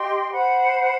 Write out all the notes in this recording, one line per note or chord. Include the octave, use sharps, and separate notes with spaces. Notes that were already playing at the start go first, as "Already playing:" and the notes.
Already playing: G4 D#5 G5 C6
C5 F#5 B5